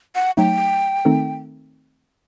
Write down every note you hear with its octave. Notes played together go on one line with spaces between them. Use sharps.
F#5
F#3 A3 D#4 G5
D#3 A3 C4 D#4 A4